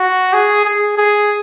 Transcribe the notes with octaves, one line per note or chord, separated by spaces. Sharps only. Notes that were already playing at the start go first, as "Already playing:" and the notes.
Already playing: F#4
G#4
G#4
G#4